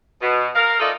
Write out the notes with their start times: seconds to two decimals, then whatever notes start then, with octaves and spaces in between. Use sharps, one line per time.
0.22 B2
0.55 A#4 F5
0.79 A3 D#4 F4 A4 D5 D#5